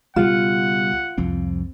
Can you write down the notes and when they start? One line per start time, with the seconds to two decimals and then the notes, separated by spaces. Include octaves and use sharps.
0.16 C#2 B2 G3 F4 F#5
1.18 C2 F2 C4